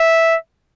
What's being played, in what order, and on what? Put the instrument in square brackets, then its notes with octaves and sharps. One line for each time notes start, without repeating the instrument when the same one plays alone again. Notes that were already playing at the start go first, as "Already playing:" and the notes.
Already playing: [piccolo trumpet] E5